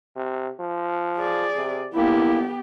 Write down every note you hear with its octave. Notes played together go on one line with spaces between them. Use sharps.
C3
F3
G#4 D5
C3
G1 A#3 B3 E4 G4